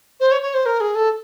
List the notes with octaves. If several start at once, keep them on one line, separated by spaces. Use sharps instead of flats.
C5
C#5
C#5
C5
A#4
G#4
A4